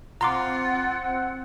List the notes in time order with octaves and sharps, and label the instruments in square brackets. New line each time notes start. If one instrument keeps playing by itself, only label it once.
[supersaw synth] C4 [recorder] F4 [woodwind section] F#5 [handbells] A#5 C6 D6